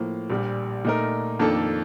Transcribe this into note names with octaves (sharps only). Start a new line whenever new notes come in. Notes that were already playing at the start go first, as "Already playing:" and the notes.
Already playing: A2 F3 A#3
A#1 A#2 G3
A#2 A3 D#4 A#4
F2 D#3 A#3 D4 A4